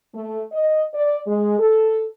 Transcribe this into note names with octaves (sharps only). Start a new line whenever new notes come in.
A3
D#5
D5
G#3
A4